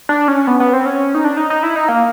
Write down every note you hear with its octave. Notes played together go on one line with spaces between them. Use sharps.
D4
C#4
B3
B3
C4
C#4
D#4
D4
D#4
D#4
E4
D#4
A#3